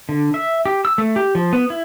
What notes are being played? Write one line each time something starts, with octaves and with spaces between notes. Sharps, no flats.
D3
E5
G4
E6
A3
G4
F3
B3
E4